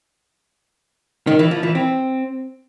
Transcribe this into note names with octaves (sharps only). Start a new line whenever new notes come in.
D#3
E3
F3
E3
C4